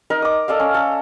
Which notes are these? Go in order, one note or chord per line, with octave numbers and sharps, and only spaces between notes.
D#4 A#4 D#5
D6 D#6
A4 D5 D#5 F5
C#4
A4